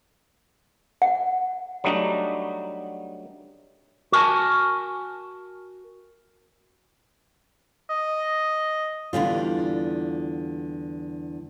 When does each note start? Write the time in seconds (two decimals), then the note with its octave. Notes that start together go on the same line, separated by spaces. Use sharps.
1.02 F#5
1.84 F#3 G3 A3 D4 D#4
4.12 F#4 A#4 G#5 A5
7.90 D#5
9.13 E2 D3 G3 F4